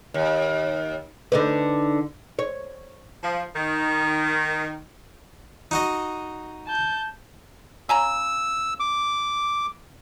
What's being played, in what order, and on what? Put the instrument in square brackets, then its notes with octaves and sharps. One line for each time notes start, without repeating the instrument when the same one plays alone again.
[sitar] D#2
[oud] D3 D#4 B4
C#5
[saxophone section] F3
D#3
[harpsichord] D#4 F#4 D#5
[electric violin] A5 G6
[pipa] C#3 G#5 A#5 [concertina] E6
[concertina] D6